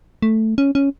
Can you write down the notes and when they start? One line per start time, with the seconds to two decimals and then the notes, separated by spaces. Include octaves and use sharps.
0.22 A3
0.58 C#4
0.75 C#4